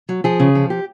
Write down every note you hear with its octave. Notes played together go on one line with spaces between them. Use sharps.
F#3
F3 G#4
C#3
F3
G4